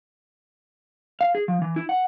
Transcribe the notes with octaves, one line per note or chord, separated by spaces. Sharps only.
F5
G#4
F3
E3
E4
F#5